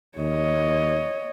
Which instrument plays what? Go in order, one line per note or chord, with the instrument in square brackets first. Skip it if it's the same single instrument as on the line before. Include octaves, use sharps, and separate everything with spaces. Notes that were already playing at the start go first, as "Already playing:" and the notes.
[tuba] D#2 [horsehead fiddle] C#5 D#5